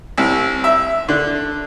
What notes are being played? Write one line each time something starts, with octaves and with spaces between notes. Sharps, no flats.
C2
E5
D3